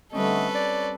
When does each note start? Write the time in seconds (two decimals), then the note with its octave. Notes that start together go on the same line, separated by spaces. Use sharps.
0.13 D3 G3 A3 C4 C#4 A4 B4 D#5
0.55 C#5 D5